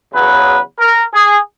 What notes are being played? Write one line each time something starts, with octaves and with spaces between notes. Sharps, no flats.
E2 C#3 F#3 B3 B4
A#4
G#4